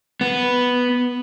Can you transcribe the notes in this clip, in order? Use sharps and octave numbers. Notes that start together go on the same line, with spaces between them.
B3